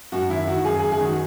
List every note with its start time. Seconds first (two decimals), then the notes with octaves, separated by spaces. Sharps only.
0.12 F#2 F#4
0.29 D#3 E4
0.47 D#3 F#4
0.65 F#2 G#4
0.79 F#2 G#4
0.92 G#4
1.01 D#3 F#4